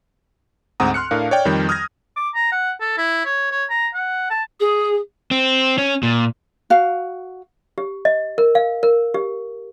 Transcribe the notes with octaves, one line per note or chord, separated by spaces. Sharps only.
D2 G#2 C4 F#5 A#5 D#6
C6 F6 F#6 C#7
A2 D4 A#4 F5
C#5 D5 G5
F2 D#3 G3 G6
D#6 F6 G6 G#6 A#6
D6
A#5
F#5
A4
E4
C#5
C#5
A#5
F#5
A5
G#4
C4
C#4
A#2
F#4 F5
G4
D#5
A#4
F5
A#4
G4